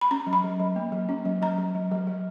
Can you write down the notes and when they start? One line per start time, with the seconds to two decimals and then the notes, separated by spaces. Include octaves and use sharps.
0.01 B5
0.11 C#4 A#5
0.27 F#3
0.33 B5
0.44 F#3
0.60 F#3
0.76 A#3
0.92 F#3
1.09 C#4
1.25 F#3
1.42 F#3 A#5
1.58 F#3
1.75 F#3
1.91 F#3
2.07 F#3